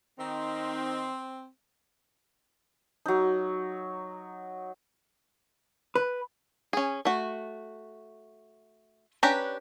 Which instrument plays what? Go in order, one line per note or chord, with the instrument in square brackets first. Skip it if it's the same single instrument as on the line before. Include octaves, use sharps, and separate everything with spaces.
[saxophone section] D#3 D#4 [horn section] C4
[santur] F#3 D#4
[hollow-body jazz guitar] B4
[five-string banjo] C#4 G#4
A3 F#4
C#4 D4 G4 B4 A#5